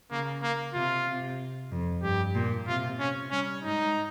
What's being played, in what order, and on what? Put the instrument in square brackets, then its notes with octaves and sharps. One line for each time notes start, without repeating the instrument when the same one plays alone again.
[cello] C#3 [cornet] A#3
[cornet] A#3
[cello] C3 [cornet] F4
[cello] C3
F2
[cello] G2 [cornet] G4
[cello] A#2
[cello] C3 [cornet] F4
[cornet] C#4
[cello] G3 [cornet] C#4
[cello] G#2 [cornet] D#4